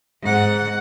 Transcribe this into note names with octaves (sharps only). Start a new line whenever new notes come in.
G#2 F#5